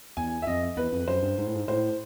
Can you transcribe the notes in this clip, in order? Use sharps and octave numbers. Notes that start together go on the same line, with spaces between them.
E2 G#5
E5
F2 D#5
E2 B4
F2
F#2 C5
G2
G#2
A2
G#2
A2 C5